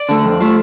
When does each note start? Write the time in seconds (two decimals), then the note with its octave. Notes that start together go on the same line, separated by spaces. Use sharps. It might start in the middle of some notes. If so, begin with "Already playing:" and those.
Already playing: D5
0.09 D3 A3
0.25 F2
0.41 F3 A3